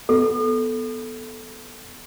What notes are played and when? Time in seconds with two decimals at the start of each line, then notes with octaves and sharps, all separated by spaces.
0.09 B3 A4